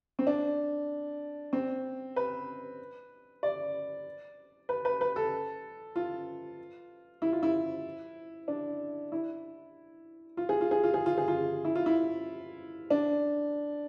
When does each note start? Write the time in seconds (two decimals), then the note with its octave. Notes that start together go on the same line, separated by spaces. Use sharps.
0.19 C4
0.27 D4
1.53 C4
2.16 B4
3.43 D5
4.69 B4
4.85 B4
5.01 B4
5.16 A4
5.96 F4
7.22 E4
7.32 F4
7.43 E4
8.48 D4
9.12 E4
10.37 F4
10.49 G#4
10.61 F4
10.71 G#4
10.83 F4
10.94 G#4
11.06 F4
11.17 G#4
11.28 F4
11.65 E4
11.75 F4
11.86 E4
12.90 D4